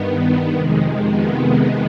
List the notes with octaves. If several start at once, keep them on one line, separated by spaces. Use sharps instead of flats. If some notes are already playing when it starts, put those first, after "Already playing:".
Already playing: G2 D#3 B3
F2 C3 D#3 G#3
B3